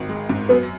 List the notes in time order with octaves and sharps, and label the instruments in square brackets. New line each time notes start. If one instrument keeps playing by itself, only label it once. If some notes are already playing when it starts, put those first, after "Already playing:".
Already playing: [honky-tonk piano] G#1 D#3
G#3
G#2
[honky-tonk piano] F#2 [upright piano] B3